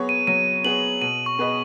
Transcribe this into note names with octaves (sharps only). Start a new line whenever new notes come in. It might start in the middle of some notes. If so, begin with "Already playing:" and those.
Already playing: F#3 B3 G#4 C#5
D#7
F#3 D#7
B3 G#4 C#5 F#7
B2 D#7
C#6
B3 G#4 B4 D#5